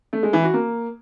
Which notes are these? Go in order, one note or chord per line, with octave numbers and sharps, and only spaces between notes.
A3
G#3
E3
F#4
A#3